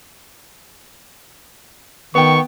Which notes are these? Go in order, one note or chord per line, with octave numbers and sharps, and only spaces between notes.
D#3 B3 G5 C#6